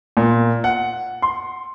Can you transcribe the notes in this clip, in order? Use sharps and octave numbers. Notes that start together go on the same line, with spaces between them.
A#2
F#5
C6